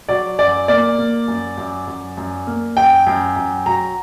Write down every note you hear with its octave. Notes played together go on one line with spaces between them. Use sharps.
F#3 D5
F#2 D5
A#3 D5
A#3
F#2
F#2
F#2
F#2
A#3
F#2 G5
F#2
F#2
F#3 A#5